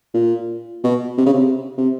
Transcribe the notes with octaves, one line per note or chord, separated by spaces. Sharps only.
A#2
B2
C3
C#3
C3
C3